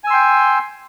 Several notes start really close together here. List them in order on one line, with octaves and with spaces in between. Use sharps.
G#5 E6 C6 G5